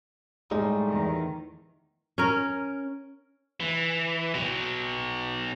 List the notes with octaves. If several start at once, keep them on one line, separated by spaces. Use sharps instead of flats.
A2 G3 G#3 D#4
E2 D#3
C#4 A#4
E3
B2 F#3